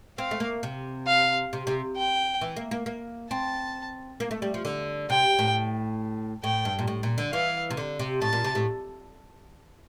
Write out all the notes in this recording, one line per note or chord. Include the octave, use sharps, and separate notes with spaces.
C4 F5
A3
A#3
C3
F5
C3
C3
G5
E3
A#3
A#3
A#3
C4 A5
A#3
A3
G3
F3
D3
C3 G5
A2
A2 G5
G2
A#2
A2
A#2
D3
E3 F5
C3
D3
C3
A2 A5
A#2
C3
A2